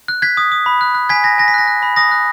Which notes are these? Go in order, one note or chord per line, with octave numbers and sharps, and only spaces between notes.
F#6
F#6 G#6 B6
D#6
D#6
B5
F#6
F#6
G#5 G#6 B6
G#5 A#6
G#5 A#6
B6
F#6 A#6
F#6
B5
D#6 A#6
F#6